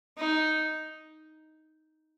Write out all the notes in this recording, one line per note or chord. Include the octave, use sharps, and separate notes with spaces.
D#4